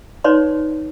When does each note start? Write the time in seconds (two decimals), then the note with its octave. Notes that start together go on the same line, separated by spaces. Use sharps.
0.24 D#4 B4 C#5 D5 C6